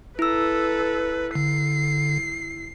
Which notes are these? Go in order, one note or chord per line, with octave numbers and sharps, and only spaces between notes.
E4 A4 B4 E6
D3 C7